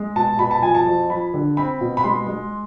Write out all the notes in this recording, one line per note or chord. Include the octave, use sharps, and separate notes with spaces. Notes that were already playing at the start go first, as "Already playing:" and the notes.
Already playing: G#3
B2 A5
B2 B5
A5
F3 G#5
A5
F2
F3 B5
D3
C4 B5
B2
B5
G#3 C6
G#3